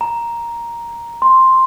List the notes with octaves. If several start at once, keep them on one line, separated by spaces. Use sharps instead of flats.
A#5
C6